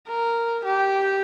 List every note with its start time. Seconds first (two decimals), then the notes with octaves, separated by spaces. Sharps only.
0.08 A#4
0.65 G4